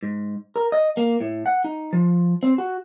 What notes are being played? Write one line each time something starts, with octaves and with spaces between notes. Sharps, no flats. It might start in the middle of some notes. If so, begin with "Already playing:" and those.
G#2
A#4
D#5
A#3
A2
F#5
D#4
F3
C4
F#4